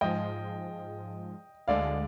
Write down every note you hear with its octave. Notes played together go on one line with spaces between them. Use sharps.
G#2 F3 G#3 D#5 G5
D2 D3 G#3 D5 F5